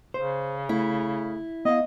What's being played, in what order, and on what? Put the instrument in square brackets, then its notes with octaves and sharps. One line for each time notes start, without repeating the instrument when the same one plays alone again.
[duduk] C#3 [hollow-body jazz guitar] C5
[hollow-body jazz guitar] A3 [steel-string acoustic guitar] E4
[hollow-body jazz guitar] B3 F5 [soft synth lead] D#5